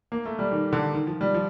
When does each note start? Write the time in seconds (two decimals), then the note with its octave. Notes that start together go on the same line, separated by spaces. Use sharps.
0.12 A#3
0.26 A3
0.39 G3
0.52 D#3
0.73 D3
0.93 D#3
1.07 F3
1.21 G3
1.34 F3